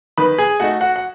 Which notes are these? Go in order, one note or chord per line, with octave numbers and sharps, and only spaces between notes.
D#3 B4 B5
G#4 G#5
A3 D#4 F#4 F#5
F#4 F#5
F#5